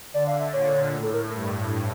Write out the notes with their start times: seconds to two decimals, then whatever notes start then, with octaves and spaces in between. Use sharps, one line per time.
0.14 D3 D5
0.27 F5
0.40 E5
0.53 A#2 C#5
0.94 A2
1.03 A4
1.14 A#4
1.33 G2